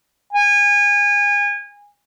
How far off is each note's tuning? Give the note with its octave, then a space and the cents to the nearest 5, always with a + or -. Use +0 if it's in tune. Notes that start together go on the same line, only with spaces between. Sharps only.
G#5 -30